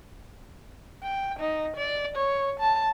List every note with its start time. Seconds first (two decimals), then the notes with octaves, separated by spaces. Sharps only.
1.03 G5
1.39 D#4
1.77 D5
2.16 C#5
2.60 A5